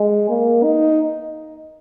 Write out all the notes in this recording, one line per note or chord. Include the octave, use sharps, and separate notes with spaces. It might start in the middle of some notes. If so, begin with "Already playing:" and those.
Already playing: G#3
A#3
D#4